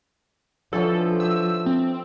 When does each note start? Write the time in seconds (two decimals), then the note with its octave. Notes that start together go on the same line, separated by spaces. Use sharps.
0.73 D3 E3 F3 C#4 A4
1.20 G4 E5 G5 E6
1.66 C4